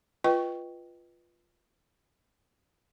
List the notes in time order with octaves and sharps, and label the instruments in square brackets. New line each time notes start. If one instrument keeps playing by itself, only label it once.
[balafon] F4 B4 D#5 G5 C#6